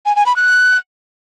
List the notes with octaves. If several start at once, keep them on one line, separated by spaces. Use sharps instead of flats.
G#5
G#5
B5
F#6